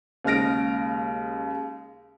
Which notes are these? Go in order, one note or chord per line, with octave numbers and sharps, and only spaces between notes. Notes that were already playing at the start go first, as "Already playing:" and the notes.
D#2 C#3 G#3 F6 A#6 D7